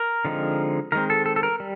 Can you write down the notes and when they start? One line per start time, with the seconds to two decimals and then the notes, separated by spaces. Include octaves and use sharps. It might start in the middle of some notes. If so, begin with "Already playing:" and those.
Already playing: A#4
0.25 D3 F3 G#3 C4 D#4
0.92 D#3 G#3 C4 A#4
1.10 A4
1.26 A4
1.36 A4
1.43 A#4
1.60 G3